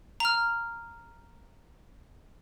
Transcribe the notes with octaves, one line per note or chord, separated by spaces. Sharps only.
A#5 F6